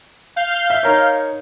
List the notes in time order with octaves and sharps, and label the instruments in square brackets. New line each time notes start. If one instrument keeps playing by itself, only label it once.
[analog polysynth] F5 G6
[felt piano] E5
D#4 A#4 C#5